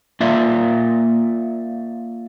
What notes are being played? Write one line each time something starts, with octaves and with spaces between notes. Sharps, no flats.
A#3 F4 D5 E5